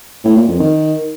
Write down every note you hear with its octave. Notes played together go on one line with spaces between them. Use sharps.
A2
A#2
F2
D#3